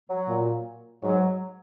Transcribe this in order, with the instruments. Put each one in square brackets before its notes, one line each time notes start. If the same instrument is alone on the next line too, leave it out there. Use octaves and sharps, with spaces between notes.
[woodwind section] F#3
[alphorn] A#2
[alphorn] G#2 [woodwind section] F#3